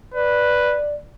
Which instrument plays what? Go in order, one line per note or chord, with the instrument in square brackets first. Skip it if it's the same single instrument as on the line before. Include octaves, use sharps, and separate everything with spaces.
[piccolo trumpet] B4 [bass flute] D5